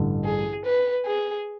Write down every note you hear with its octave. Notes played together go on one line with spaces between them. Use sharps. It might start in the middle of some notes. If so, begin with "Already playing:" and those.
Already playing: A1 G2 D3
G#4
B4
G#4